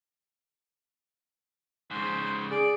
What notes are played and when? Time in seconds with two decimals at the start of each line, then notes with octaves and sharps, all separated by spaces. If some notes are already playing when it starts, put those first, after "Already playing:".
1.91 G#2 C#3 C5
2.51 G#4 D5